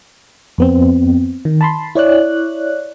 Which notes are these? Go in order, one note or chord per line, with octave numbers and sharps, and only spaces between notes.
F2 B3 C4
D#3
A5 B5 C6
E4 C#5 D5 F#6